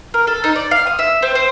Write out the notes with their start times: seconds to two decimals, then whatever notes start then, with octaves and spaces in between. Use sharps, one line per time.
0.14 A#4
0.27 A4
0.44 D#4
0.55 D5
0.71 F5
0.87 D#6
0.99 E5
1.22 C4
1.35 C5